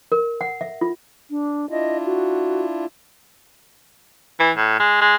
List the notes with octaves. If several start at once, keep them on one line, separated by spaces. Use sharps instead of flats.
A#4
F#5
E5
F4
D4
D4 E4 F4 D#5
F#4
E3
A2
G#3
G#3